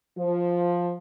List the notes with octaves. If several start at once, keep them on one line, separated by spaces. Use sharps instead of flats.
F3